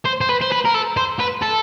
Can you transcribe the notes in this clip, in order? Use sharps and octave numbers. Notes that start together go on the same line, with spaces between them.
C5
C5
B4
C5
B4
A#4
A4
C5
B4
A4